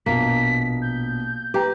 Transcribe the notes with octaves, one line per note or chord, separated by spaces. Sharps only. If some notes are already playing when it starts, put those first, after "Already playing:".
A#1 B2 A#3 B6
G6
G4 B4 G5 A#5